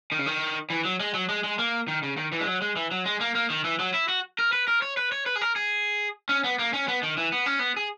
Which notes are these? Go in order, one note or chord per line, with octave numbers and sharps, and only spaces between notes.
D#3
C#3
D#3
E3
F#3
G#3
F#3
G#3
G#3
A#3
D#3
C#3
D#3
E3
G#3
F#3
G#3
E3
F#3
G#3
A#3
A#3
D#3
E3
F#3
E4
F#4
A#4
B4
A#4
C#5
B4
C#5
B4
G#4
A#4
G#4
C#4
B3
A#3
C#4
B3
D#3
E3
B3
C#4
B3
G#4